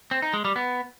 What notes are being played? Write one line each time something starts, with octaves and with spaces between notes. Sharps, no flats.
C4
D#4
G#3
G3
B3